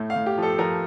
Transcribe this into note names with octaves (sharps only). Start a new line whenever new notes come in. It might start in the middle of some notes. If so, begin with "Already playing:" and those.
Already playing: A2 A3
F5
A2
G4
F3
A4
F3 A#4